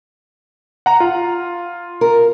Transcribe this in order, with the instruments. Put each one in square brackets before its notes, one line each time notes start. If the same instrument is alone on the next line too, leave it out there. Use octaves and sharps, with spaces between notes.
[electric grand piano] F#5 A#5
F4
[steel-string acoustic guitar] A#4